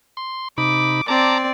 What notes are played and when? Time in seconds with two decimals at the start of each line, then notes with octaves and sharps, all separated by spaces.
0.17 C6
0.58 C3 D#4 B5 D6
1.08 C4 D5 A5 A#5 D6